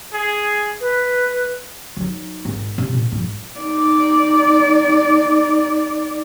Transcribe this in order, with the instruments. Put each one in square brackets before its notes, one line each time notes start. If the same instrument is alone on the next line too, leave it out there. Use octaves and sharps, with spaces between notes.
[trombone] G#4
[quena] B4
[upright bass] F#3 D#4
G#1 C4
C3
A#2 C#3
G#2 F3
[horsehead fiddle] D#4 D5